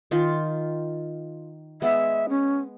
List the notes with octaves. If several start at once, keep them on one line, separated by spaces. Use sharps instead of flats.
D#3 F4 C6
G#3 B3 E5
C#4